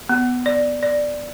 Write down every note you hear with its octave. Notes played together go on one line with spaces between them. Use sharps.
B3
D5
D5